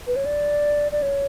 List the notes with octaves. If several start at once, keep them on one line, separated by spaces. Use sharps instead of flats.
B4
C#5
D5
D5
C#5